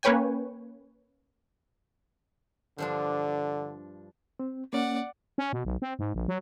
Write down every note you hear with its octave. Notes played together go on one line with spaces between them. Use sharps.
A#3 C#4 B4 C#5 G5 G#5
G2 D3 F3 D4
C4
A#3 C#4 D5 F#5
C#4
B2
B1
C4
G#2
A#1
F#3